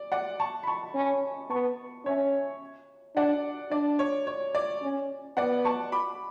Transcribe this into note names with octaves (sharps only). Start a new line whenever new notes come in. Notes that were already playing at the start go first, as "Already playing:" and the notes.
Already playing: D5
D5 F#5
A5 C#6
B5
A5 C#6
C#4
B3 A5 C#6
C#4 C#5 E5
D4 D5 F#5
D4 D5
C#5
C#5
D5
C#4
B3 D5 F#5
A5 C#6
B5 D6